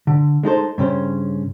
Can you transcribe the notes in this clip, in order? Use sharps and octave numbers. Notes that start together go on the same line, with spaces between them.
D3
G#3 D#4 A4 C5
G2 C#3 C#4 C5